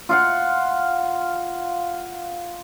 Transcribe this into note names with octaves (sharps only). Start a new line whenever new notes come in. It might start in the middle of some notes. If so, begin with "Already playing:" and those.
F4 F5 F#5